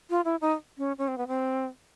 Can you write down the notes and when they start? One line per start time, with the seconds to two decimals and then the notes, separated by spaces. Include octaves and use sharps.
0.10 F4
0.25 E4
0.41 D#4
0.78 C#4
0.98 C#4
1.08 C4
1.18 B3
1.28 C4